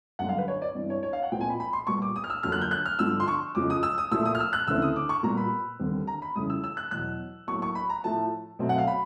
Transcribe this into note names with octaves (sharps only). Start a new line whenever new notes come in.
F#2 D3 G3 F#5
F5
B4
C#5
D5
G2 E3 G#3 C4
C#5
C#5
F5
F#5
A#2 F3 G#3 C4 G5
G#5
B5
B5
C6
A#2 G3 B3 C#6
D6
D#6
F6
E6
F2 D3 F#3 A#3 F6
F#6
G6
F#6
F6
G2 D3 F3 E6
C6
C#6
F2 C#3 F3 G#3 D6
D#6
E6
D#6
A#2 F3 A3 E6
D#6
F6
E6
F#6
D2 C#3 E3 A3 C4 E6
D#6
D6
C#6
A#2 G3 B3 A#5
B5
D#2 D3 G3 C4
A#5
B5
F2 C#3 E3 G3 D#6
E6
E6
F#6
E2 B2 F#3 F#6
A2 F#3 A#3 C#6
C#6
B5
A#5
A2 F3 A3 A5
B2 F#3 A3 C4
F#5
F5
B5